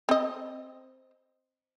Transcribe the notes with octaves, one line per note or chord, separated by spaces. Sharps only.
C4 D#5